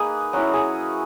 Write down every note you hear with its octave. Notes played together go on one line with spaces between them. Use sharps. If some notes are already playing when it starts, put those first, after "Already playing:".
Already playing: A#3 D#4 G#4 B4
F#3 C#4 E4 F#4
G#4